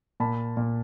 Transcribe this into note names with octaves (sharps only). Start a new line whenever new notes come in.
A#2 A5 B5
A#2